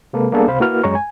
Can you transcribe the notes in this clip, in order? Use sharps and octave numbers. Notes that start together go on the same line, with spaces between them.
C3 G#3 A#3 A4 B4
G3 A#3 B3 D4 G#4 A4
C#2 C3 C5 F5 B5
A#3 E4 F#4 A#4 B4 F6
F#2 G#3 C#5 A#5 C#6
G#5